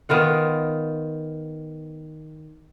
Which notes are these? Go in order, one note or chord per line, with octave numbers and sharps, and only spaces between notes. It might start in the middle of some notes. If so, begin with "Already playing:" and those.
D#3 B3 F4 F#5